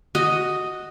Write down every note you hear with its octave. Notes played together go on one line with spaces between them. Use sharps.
F#4 D#5